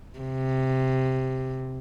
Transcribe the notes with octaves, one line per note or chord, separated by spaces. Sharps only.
C3